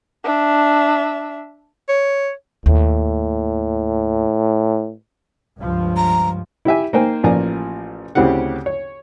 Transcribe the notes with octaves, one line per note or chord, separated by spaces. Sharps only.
D4 E5
C#5
D#2 A2
C#2 G2 F3
A#5
E4 G4 E5 G#5
A#3 D#4 C5 G5 G#5
A1 F3 A#3 D5 G#5 A#5
D2 C#3 C4 E4 G4 F#5
C#5